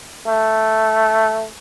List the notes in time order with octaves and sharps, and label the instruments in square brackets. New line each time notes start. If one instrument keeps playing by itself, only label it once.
[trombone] A3